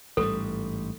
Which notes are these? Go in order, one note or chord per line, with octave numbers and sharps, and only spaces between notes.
A1 G#2 G3 A4